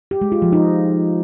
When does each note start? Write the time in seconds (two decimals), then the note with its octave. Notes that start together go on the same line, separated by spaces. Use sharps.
0.11 G4
0.21 G#3
0.32 F4
0.42 F3
0.52 D#4